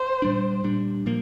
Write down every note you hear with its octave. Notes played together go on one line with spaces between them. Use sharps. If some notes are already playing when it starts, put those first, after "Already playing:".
Already playing: C5
A#2 G3 D4
A#2 G3 D4
A#2 F3 A#3